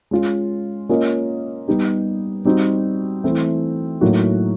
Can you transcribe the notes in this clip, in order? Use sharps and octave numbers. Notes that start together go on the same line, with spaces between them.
G#3 C#4 F4
A#3 C#4 F4 A#4 D#5
G3 B3 D#4 G4
G3 C4 D#4 F#4
E3 A3 C4 E4
A2 F#3 A#3 D#4 F#4